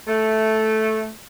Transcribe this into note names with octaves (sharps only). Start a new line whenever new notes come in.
A3